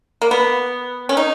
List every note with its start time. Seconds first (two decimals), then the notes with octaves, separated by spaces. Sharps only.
0.22 A#3
0.31 B3
1.09 C#4
1.17 D#4